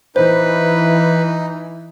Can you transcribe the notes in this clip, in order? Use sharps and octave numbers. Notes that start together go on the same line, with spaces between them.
E3 D#4 B4 C5